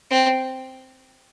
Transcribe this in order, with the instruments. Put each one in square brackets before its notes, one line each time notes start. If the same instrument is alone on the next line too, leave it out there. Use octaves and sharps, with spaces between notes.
[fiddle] C4